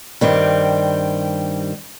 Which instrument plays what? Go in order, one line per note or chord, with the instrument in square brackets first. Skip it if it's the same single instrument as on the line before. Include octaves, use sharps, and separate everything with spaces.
[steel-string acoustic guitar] G2 D#3 G3 C4